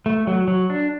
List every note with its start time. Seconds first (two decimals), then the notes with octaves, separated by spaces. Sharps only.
0.06 A3
0.27 F#3
0.48 F#3
0.70 D4